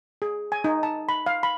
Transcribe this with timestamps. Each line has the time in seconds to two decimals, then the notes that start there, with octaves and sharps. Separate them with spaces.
0.22 G#4
0.52 G#5
0.64 D#4
0.83 A5
1.09 B5
1.26 F5
1.43 B5